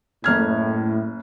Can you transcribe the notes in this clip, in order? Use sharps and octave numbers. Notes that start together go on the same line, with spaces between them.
F#1 A2 F6 G#6